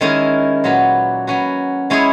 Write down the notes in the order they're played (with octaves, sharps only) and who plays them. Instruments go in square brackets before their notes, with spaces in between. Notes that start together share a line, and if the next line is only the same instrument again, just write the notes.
[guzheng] D#3 G#3 C#4 E4 A#4
A#2 F#3 C#4 F#4 B4
F#3 C#4 F#4 B4
G#3 C#4 E4 G#4 C#5